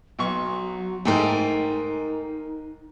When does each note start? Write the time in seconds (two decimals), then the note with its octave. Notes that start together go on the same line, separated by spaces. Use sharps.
0.19 B1 F#3 C#6
1.05 G#2 A3 D#4 A#4 G5 G#5